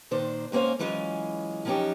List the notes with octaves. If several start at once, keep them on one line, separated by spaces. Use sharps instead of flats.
A#2 D#3 D4 C5
G#2 A#3 C#4 C5 F5
E3 F#3 G#3 C#4 F4
F3 F#3 B3 C#4 D#4 G4